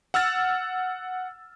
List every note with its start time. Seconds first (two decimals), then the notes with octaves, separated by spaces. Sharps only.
0.14 F#5 E6 F6 A6